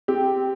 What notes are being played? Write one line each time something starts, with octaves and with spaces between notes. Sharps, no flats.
C4 G4